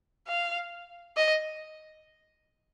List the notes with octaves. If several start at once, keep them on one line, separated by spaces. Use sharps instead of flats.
F5
D#5